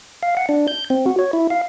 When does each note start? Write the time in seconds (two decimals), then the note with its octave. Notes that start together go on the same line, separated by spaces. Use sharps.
0.23 F5
0.37 F#5
0.49 D4
0.68 G6
0.90 C4
1.06 F#4
1.19 C#5
1.33 E4
1.50 F5